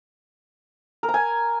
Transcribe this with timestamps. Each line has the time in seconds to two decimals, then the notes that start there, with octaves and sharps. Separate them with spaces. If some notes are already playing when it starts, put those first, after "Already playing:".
1.03 A#4
1.08 A#5
1.14 G#5